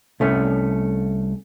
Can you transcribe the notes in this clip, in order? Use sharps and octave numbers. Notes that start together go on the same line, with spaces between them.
C2 A3 C#4